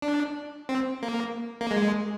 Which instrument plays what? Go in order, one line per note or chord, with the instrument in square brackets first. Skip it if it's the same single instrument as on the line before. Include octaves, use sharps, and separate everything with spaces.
[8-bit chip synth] D4
C4
A#3
A#3
G#3